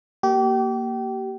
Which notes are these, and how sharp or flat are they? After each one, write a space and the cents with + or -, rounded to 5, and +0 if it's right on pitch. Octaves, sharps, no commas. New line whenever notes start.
A#3 +0 G4 -30